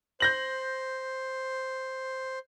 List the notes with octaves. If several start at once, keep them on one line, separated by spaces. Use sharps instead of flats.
C5 G6 A#6 F#7